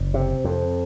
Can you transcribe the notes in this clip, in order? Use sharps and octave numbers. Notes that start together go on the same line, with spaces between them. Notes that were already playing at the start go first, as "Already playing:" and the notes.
Already playing: F#1
C3
F2